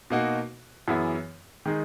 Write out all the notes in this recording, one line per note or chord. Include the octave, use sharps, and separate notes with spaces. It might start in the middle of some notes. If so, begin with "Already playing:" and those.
B2 A#3 D#4 F#4
F#2 E3 B3 E4 G#4
D#3 G#3 D#4 G#4